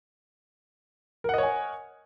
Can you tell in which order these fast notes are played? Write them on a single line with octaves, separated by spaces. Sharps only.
A#4 F#5 D#5 C#5 G#5